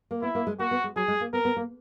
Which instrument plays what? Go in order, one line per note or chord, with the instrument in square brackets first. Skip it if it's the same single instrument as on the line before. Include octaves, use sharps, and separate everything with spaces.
[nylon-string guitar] A#3
[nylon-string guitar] B3 [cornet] E4
[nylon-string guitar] A#3
G#3
[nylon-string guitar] A#3 [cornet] F#4
[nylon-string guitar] B3
G#3
[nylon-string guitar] F#3 [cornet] G#4
[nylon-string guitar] G#3
A#3
[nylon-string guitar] B3 [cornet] A#4
[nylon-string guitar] B3
A#3